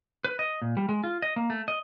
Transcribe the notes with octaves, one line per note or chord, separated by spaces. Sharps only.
B4
D#5
A#2
G3
G#3
F4
D#5
A#3
A3
D#5